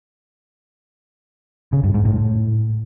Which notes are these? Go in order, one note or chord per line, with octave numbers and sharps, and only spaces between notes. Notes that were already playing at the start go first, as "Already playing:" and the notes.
C#3
G2
G#2
A2